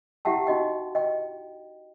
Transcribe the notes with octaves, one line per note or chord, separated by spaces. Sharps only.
E4 G4 E5 F#5 G5 A5
D#4 F#4 D#5 G5
D#5 G5